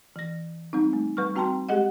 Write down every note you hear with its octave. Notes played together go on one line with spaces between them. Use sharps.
E3 A#6
G3 C4 D#4
A3
G3 B4 C#6 F6
C4 F#4 G5 A5 A#5 C6
G#3 G4 G#4 D#5 F#5